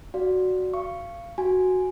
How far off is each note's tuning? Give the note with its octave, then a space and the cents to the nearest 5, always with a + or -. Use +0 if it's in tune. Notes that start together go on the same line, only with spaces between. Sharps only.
F#4 +0 D5 -5 F5 +0
F5 -25 C#6 +0
F#4 +0 G#5 +0